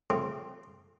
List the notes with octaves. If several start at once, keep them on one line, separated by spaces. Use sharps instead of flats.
C#3 A3 C4 F4 G4